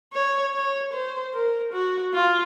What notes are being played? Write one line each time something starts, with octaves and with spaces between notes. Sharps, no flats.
C#5
C#5
C5
A#4
F#4
F4